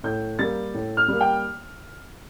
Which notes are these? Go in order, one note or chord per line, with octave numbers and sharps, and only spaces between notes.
A2 G6
G3 A#3 A6
A2
F6
G3 A#3
G5